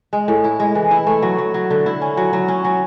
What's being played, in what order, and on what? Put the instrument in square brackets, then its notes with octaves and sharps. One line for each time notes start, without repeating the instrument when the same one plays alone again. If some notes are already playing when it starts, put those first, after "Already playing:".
[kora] G#3
A2
E4
G#3
E3
E4
A3
F#3
F#3
F#3
D3
E4
C#4
F#3
F#3
C#4
F#3